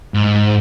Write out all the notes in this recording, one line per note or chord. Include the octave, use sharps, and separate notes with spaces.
G#2